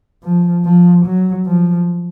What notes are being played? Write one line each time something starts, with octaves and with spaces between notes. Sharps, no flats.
F3
F3
F#3
F3